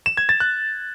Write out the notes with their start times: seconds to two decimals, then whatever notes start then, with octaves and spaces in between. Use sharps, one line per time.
0.06 E7
0.17 G#6
0.29 A6
0.40 F#6